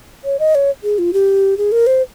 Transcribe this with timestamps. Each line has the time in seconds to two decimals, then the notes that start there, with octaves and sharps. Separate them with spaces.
0.25 C#5
0.39 D#5
0.55 C#5
0.84 G#4
0.99 F4
1.13 G4
1.58 G#4
1.72 A#4
1.87 C5